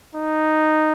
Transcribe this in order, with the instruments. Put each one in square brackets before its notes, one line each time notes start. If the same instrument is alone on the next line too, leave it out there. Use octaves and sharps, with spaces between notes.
[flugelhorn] D#4